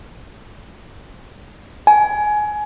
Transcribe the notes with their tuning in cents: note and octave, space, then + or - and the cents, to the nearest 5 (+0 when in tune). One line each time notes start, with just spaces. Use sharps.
G#5 +20